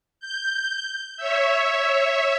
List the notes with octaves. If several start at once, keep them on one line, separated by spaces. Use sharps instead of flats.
G6
C#5 E5